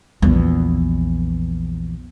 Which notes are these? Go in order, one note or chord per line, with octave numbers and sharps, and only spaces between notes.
A#1 E2